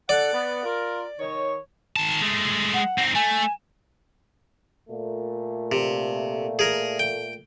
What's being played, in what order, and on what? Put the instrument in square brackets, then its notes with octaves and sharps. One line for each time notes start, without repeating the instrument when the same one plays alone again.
[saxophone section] D3 A4 F#5 [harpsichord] D5
[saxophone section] B3
F4 A#4
D#3 D#4 C#5
[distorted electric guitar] D#3 A5
G#3 A3
[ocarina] F#5
[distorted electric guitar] C4 D#4
[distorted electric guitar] A3 [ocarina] G#5
[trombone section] A#2 A3
[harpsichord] C3
G#4 A#4
G5